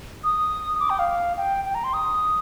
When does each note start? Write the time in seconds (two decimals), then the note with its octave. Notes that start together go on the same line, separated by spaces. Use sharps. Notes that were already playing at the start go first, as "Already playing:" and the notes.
0.24 D#6
0.80 D6
0.90 G5
0.99 F5
1.37 G5
1.65 G5
1.75 A#5
1.84 C6
1.94 D#6